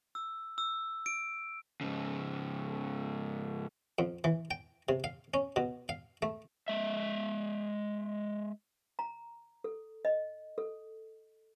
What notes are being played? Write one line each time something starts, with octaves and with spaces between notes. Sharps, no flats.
E6
E6
D7
G#2 C#3
F2
E3
G5
C3
F5
C#4
B2
F5
A3
G#3 E5
A#5
A4
D#5
A4